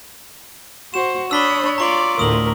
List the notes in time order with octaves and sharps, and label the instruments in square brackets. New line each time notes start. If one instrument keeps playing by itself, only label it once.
[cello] F#4 C5 [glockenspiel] E7
[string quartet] D4 B5 D#6 [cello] C#5 [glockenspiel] E6 B6 G7
[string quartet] F4 [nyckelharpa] D5 D6 [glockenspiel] A#5 C#6 F#7
[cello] D2 A2 [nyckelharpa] A#4 [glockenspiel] D#6 F#7